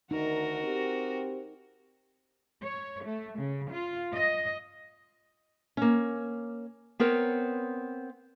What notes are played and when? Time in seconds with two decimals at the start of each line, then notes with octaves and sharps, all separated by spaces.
0.11 D2 D#3 D#4 F#4 A#4
0.64 C4 G4
2.64 C#5
3.04 A3
3.40 C#3
3.72 F4
4.13 D#5
5.77 A#3 C#4
7.00 B3 C4 A#4 C#5